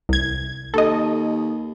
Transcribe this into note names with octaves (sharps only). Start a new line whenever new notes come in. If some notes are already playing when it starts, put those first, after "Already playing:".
C2 G#6
D#2 A4 D#5